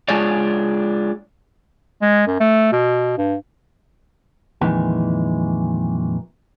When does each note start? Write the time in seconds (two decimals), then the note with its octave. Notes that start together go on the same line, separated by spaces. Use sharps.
0.09 G#3 D4 F4 G#4 C#5 D5
2.02 G#3
2.27 F#2
2.40 A3
2.72 B2
3.18 G2
4.61 F2 A#2 D#3 E3 G#3